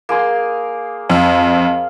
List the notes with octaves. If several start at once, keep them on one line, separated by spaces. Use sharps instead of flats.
A#3 G#4 C6
F2 F5